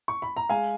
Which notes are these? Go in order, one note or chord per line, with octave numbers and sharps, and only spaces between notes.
C#6
B5
A#5
G#3 F5 G#5